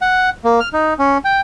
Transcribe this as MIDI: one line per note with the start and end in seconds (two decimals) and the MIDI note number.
0.02 0.30 78
0.44 0.60 58
0.60 0.69 89
0.73 0.94 63
0.99 1.18 61
1.24 1.41 79